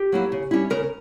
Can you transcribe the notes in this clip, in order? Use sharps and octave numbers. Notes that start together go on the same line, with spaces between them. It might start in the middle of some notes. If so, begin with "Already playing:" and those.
Already playing: G4
F#3 A#3 E4
C#3
G3 C#4 E4
C#3 A#4